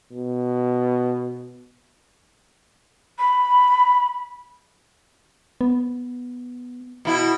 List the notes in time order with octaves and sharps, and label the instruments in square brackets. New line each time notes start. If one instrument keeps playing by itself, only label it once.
[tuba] B2
[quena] B5
[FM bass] B3
[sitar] B2 E4